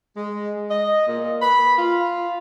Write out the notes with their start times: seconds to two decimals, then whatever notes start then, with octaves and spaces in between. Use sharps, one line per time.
0.16 G#3
0.69 D#5
1.06 A#2
1.42 B5
1.78 F4